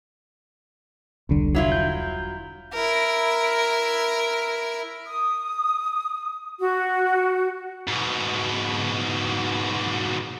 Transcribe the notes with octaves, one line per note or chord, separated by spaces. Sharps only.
E1 C2 D3 G3
F#3 E4 F4
G6
E4 A#4
D#6
F#4
G#2 B2